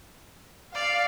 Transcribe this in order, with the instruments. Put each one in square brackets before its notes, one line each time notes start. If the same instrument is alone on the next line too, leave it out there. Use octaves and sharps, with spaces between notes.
[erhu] D5 [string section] F5